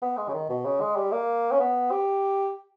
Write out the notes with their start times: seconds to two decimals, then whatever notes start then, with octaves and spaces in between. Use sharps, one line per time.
0.02 B3
0.18 G#3
0.28 C#3
0.34 D#3
0.49 B2
0.65 C#3
0.81 G#3
0.96 G3
1.12 A#3
1.52 C#4
1.60 B3
1.91 G4